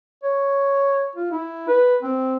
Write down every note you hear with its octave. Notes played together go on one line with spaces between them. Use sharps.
C#5
F4
E4
B4
C4